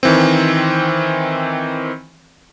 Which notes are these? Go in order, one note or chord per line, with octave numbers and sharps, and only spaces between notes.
D#3 E3 C4